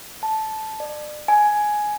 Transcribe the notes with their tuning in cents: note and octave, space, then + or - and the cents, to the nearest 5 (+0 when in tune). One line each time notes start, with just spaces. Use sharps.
A5 -10
D5 +35
G#5 +10